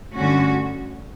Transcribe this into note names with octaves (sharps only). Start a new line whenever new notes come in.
G2 D3 A3 C#4 F#4